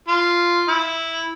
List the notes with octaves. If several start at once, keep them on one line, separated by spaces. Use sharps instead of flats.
F4
E4